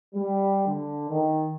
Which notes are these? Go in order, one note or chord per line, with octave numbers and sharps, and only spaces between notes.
G3
D3
D#3